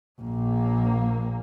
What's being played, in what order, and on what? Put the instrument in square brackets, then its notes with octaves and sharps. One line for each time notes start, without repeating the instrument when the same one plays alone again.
[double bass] A#1 A#3